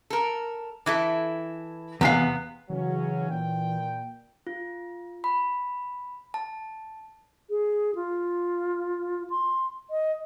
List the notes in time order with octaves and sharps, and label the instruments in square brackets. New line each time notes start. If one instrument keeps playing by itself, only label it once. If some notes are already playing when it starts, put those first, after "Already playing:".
[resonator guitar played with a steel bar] A4 A#4
E3 E4 A4
[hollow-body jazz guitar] E2 F5 [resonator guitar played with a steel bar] C3 B3
[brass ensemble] C#3 F#3 C#4 [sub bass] E3
[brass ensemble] A#2 G5
[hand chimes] F4
B5
A5
[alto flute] G#4
F4
C6
D#5